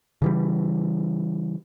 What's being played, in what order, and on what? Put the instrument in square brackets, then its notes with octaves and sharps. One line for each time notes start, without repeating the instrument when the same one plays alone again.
[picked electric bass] C#3 E3 G3